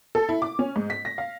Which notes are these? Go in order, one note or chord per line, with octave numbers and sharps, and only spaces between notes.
A4
E4
D6
C#4
G#2
B6
A#6
F5